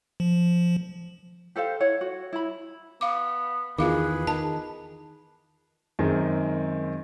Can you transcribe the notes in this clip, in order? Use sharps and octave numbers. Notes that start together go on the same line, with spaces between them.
F3
G4 A4 C5 F5
E4 C#5 F#5
F#4
E4 B5
B3 F5 D6
E2 D#3 F4 G#4 B4 F5 D6
D#3 A5
F#2 D#3 G#3 C4